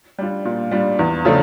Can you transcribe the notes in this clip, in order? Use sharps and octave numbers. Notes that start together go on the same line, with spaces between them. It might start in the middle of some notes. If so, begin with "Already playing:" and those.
G3 D4 F4
A#2
G3 D4 F4
E2
C#3 F3 A3 D4